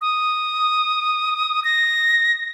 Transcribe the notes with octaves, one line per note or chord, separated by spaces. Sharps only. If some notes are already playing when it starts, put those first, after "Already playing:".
D#6
A#6